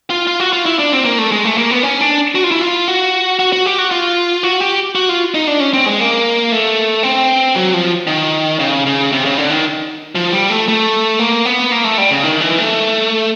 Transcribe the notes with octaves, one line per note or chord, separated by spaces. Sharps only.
F4
F4
F#4
F4
E4
D4
C4
A#3
A3
G#3
A3
A#3
B3
C#4
D4
F#4
F4
E4
F4
F#4
F#4
F#4
G4
F#4
F4
F#4
G4
F#4
F4
D#4
D4
C#4
C4
G#3
A#3
A3
C4
F#3
F3
D#3
C#3
C#3
C3
C#3
D3
D#3
F3
G3
A3
A3
A#3
B3
A#3
A3
G3
C#3
D#3
E3
A3